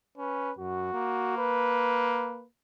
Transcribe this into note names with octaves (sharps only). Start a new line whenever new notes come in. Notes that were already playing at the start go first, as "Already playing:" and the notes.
C#4 B4
F#2 F#4
A#3
B4